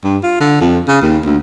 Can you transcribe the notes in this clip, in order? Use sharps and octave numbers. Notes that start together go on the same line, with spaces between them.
G2
F4
D3
F2
C#3
D#2
D2